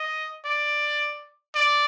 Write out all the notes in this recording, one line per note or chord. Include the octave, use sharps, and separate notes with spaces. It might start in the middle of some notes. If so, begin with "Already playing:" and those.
Already playing: D#5
D5
D5